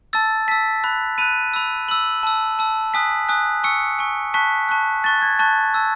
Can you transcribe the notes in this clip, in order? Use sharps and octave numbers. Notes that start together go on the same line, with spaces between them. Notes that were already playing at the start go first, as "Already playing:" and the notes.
A5 E6 A6
A5 E6 B6
B5 F#6
B5 F#6 D#7
B5 E6
B5 E6 F#7
A5 E6
A5 E6
G#5 D#6 F#6 B6
G#5 D#6 F#6
G#5 C#6 E6 C#7
G#5 C#6 E6
A5 C#6 F#6 B6
A5 C#6 F#6
A5 C#6 F#6 A6
G#6
A5 C#6 F#6 A6
A5 E6